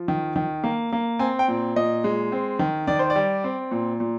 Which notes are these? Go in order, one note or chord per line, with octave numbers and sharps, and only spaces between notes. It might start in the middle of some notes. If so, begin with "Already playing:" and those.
Already playing: F3
D#3
D#3
A#3
A#3
C4 G#5
G5
A#2
A#2 D#5
G#3
C4
D#3
D#3 D5
C5
D5
G3
C4
A#2
A#2